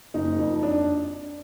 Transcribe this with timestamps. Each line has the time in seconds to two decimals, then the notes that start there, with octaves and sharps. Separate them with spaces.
0.14 F#1 D#4
0.39 F2
0.63 D4